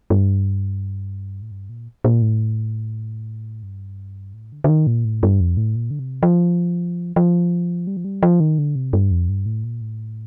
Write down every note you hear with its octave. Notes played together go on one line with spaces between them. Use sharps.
G2
A2
G2
A#2
A#2
A2
G2
A2
D3
D3
D#3
A#2
A2
G2
F2
A2
A#2
D3
C3
F3
F3
G3
F3
G3
F3
D#3
D3
C3
G2
F2
G2
A2
A#2
A2